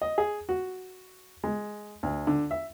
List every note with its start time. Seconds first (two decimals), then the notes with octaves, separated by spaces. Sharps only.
0.02 D#5
0.18 G#4
0.49 F#4
1.44 G#3
2.03 D2
2.27 D3
2.51 E5